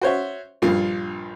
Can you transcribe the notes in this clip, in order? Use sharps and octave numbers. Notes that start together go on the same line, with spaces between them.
F#4 C5 C#5 E5
A#1 G2 F4